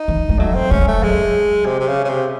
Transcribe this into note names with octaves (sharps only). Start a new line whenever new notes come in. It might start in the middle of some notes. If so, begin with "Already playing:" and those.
Already playing: D#4
E3
G#3
F#3 A3
C4
G#3 C#4
A3
F#3 G#3
C3
C3
C#3
C#3
C3